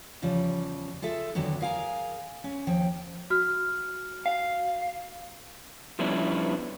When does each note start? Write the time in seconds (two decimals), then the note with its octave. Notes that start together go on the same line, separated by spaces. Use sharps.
0.22 E2 C#3 F3 G3
1.02 F4 G#4 A4 E5
1.35 E2 D3 D#3 F#3 B3
1.61 G#4 A#4 F5 G5 G#5 A#5
2.44 C#4
2.67 D#2 F3 G5
3.30 F#4 F6
4.26 F5
5.99 F3 G3 B3 C#4 D4 E4